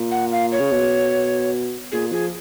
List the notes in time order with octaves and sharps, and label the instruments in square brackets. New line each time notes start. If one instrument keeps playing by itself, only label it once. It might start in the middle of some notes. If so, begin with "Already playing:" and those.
Already playing: [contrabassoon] A#2
[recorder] F#5
F5
C#5
[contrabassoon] C#3
B2
[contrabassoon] A#2 [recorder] G#4
[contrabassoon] F3 [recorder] G#4